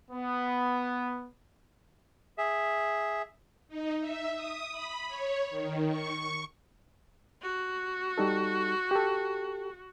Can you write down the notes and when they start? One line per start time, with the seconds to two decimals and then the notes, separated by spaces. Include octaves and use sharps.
0.11 B3
2.38 G#4 E5
3.68 D#4
4.00 E5
4.34 D#6
4.72 B5
5.08 C#5
5.50 D#3
5.88 C#6
7.42 F#4
8.18 G3 D#4 A4
8.91 G4 A4